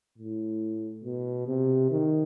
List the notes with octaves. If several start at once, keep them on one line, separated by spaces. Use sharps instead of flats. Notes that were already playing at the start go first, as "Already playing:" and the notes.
A2
B2
C3
D#3